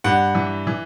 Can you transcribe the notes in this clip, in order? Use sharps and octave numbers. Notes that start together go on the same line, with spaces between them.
G2 F#5
E3
E3